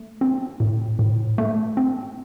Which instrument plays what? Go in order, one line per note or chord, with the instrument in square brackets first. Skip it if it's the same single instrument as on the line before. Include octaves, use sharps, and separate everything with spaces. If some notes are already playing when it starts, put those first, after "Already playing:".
Already playing: [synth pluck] A3
C4
A2
A2
A3
C4